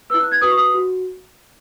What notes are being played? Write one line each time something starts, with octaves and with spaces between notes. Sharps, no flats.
E4 B4 E6
F#6
G#6
F#4 B4 D#6
C#6
D#6
F#4